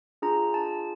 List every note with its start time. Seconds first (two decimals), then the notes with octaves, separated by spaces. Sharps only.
0.22 D4 F4 G#4 A#5
0.54 A5